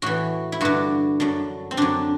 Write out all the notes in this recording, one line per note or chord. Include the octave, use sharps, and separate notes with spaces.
A2 E3 F#4
E4
G2 D3 F#4
F#2 D3
C4
F#2 D3 D4